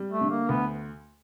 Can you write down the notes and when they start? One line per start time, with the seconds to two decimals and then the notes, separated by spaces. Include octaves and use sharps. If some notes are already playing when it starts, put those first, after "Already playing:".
Already playing: G3
0.11 A3
0.21 D3
0.30 A#3
0.49 D2 B3